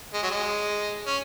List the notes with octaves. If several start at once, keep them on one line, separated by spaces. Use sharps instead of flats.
G#3
F#3
G#3
C#4